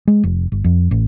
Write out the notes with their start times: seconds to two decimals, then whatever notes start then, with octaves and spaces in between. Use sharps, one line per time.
0.07 G#3
0.24 F1
0.52 G1
0.64 F2
0.91 A1